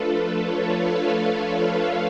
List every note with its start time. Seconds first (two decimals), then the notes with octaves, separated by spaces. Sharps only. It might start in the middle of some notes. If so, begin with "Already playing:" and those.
Already playing: F3 A3 D4 F4 A4 B4
0.13 B4
0.42 C#5
0.70 F5
0.98 F5